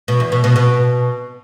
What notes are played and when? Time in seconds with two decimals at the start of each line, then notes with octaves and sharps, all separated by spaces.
0.08 B2
0.20 E2
0.32 B2
0.44 B2
0.56 B2